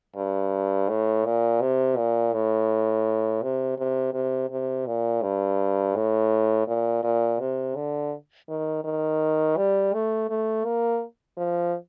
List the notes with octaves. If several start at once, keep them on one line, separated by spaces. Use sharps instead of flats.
G2
A2
A#2
C3
A#2
A2
C3
C3
C3
C3
A#2
G2
A2
A#2
A#2
C3
D3
D#3
D#3
G3
A3
A3
A#3
F3